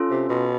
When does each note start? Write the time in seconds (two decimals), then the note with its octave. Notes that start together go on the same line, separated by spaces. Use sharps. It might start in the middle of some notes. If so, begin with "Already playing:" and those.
Already playing: C#4 F4 A4
0.11 C3
0.29 B2